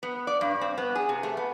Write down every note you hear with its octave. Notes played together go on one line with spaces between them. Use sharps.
B3
D5
G2
C4
B3
G#4
C3
A3
B3